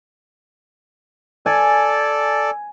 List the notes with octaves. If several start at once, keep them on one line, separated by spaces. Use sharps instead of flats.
A4 D5 G#5